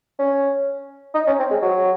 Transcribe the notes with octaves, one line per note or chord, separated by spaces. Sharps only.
C#4
D#4
C#4
C4
G#3
F#3